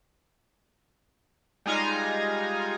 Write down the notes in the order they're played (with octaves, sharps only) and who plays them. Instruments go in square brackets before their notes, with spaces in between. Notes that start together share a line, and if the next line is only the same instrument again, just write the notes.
[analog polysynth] G3 G#3 D#4 F4 G#5 A#5